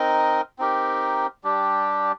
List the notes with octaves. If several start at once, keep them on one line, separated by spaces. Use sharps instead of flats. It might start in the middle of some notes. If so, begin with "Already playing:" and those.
Already playing: C4 D#4 A#4 D#5
C4 D#4 G4 A#4
G3 D4 G4